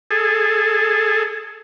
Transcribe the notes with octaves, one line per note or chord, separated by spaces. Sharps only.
G#4 A4